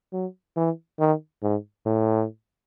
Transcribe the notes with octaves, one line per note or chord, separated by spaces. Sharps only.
F#3
E3
D#3
G#2
A2